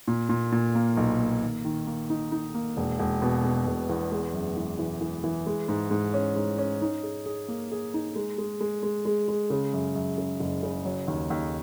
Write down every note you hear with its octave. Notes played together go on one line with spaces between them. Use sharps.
A#2
A#2
A#2
A#3
B1
A#3
D#3
D#3
A#3
D#4
D#4
A#3
E1
E1
B2
B2
E1
E2
G#3
F#2
E3
E3
E3
E3
G#3
G#2
G#2
C#4
G#2
C#4
D#4
G#4
G#4
A#3
G#4
D#4
G#3
G#3
G#3
G#3
G#3
G#3
C#3
F#2
F#2
C#3
F#1
C#3
F#3
D#2
D#2